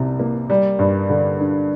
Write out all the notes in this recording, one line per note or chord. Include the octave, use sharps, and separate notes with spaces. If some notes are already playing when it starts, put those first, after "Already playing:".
Already playing: C2 C3
A#3
G3
G2
D3
D4